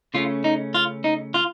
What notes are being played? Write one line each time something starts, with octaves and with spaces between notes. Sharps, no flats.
C#3 A3 C#4 F4
D#4
F4
D#4
F4